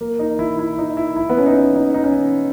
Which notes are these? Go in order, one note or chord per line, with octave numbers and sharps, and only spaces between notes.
A#3
D#4
E4
E4
D#4
E4
E4
B3
C#4
D#4
D#4
D#4
C#4